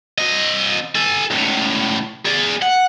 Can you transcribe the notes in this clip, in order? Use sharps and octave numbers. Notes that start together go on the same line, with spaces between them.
C4 D#5
A4 G#5
C#2 A2
G#4 D5
F#5